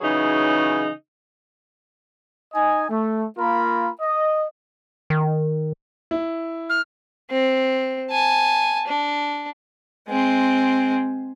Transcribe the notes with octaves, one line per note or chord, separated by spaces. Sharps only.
C#3 E3 F#3 D#4 G#4
D#4 D#5 G#5
A3
A#3 F4 A#4 B5
D#5
D#3
E4
F6
C4
G#5 A5
D4
G#3 C4